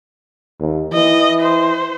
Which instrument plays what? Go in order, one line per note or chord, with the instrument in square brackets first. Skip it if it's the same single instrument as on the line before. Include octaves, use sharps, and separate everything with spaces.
[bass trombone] D#2
[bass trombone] E3 [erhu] D#5
[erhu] C5